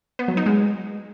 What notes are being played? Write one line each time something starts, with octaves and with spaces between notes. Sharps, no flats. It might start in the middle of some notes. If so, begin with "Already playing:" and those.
B3
F#3
D#4
G#3